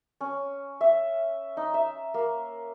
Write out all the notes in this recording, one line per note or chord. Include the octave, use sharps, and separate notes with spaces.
C#4
E5
D#4
E5
A#3